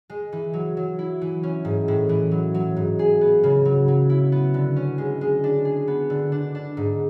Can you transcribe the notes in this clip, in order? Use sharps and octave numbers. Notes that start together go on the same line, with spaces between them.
G#3
E3
F#3
F#3
E4
E3
C#4
G#2
A2
E3
F#3
F#3
G#2
G#4
B3
C#3
F#3
F#3
E4
B3
D3
C#4
G#3
G#3
D4
G#4
B3
D3
D4
D4
G#2